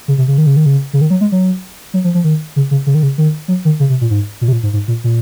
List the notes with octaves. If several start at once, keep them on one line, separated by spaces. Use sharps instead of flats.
C#3
C3
C#3
D#3
C#3
D#3
C#3
C#3
D#3
F#3
G#3
F#3
F#3
F3
F3
D#3
C#3
C#3
C#3
D#3
C#3
D#3
F#3
D#3
C#3
C3
A#2
G#2
A#2
C3
A#2
G#2
G#2
A#2
A#2